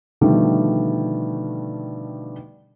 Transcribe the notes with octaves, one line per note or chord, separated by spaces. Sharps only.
B2 D3 D#3 F3 G3 A3